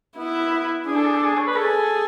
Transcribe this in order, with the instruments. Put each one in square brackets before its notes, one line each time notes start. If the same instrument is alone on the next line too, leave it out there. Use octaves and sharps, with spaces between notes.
[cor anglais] B3 [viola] E4
[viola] D4 [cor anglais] G#4
[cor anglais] A4
G#4
A4
G#4
C#5
B4
[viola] G#4 [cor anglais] A4